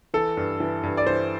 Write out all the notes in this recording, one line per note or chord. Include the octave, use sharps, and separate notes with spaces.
E3 A4
G2
E3
G2
D5
E3 C5